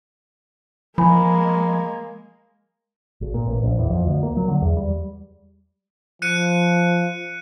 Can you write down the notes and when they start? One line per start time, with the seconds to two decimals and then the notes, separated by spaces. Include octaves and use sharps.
0.98 F3 G#3 A#3 G#5 B5
3.21 G#1
3.34 A#2
3.48 A1
3.63 A#1
3.79 E2
3.90 F2
4.06 D2
4.23 A#3
4.37 F#3
4.48 D3
4.62 E2
4.77 G3
6.22 F3 F#6 C#7 D#7